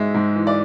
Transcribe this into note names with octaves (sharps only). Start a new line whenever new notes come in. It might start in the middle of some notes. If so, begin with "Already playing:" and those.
Already playing: G#2 G#3 E5
G#2
E3
D5